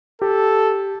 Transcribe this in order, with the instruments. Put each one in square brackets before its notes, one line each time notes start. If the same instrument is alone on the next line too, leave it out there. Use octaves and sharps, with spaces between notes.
[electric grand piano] G4 [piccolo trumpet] A4